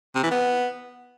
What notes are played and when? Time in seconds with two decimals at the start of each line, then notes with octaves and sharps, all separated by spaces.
0.16 C3
0.23 E3
0.31 B3